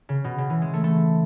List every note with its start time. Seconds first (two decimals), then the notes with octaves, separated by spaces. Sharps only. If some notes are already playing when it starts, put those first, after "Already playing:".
0.09 C#3
0.24 B2
0.38 C#3
0.50 E3
0.62 G#3
0.73 A3
0.84 A3